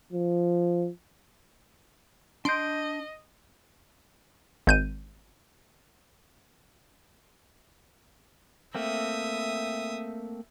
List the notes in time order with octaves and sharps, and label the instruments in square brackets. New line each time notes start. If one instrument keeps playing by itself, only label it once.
[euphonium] F3
[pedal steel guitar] D4 G6 [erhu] D#5 [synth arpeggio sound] C6 D7
[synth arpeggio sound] G#1 G6 D#7
[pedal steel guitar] A3 A#3 C4 [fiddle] E5 D#6